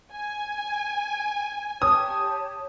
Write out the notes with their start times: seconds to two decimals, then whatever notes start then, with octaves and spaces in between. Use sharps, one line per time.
0.12 G#5
1.82 G4 C#5 A5 D#6